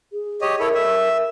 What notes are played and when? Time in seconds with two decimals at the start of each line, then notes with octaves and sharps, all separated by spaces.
0.13 G#4
0.41 G4 C#5 D#5
0.60 E4 A4 A#4 C#5
0.74 E5